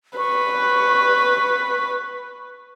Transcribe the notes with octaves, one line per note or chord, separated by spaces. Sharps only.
B4 C#6